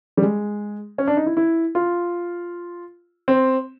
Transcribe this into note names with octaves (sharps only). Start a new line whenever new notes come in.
G3
G#3
C#4
D4
D#4
E4
E4
F4
C4